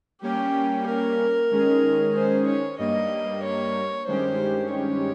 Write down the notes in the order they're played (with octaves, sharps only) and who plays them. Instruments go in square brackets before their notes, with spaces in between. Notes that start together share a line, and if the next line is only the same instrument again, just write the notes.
[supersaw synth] G3 A#3 C#4 [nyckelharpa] G4
[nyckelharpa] A#4
[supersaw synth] D#3 G#3 C#4 G#4
[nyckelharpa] C5
C#5
[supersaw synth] G2 G3 A#3 [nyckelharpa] D#5
[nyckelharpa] C#5
[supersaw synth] G2 D#3 G#3 C#4 G4 [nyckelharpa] C5
[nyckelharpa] C#5